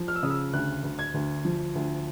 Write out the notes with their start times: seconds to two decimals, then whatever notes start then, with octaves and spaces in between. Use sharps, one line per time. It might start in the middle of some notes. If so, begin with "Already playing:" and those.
Already playing: F3
0.08 F6
0.15 E6
0.23 C#3 D#6
0.30 E6
0.53 D2 F#6
0.83 D2
0.99 G#6
1.14 D2
1.45 F3
1.75 D2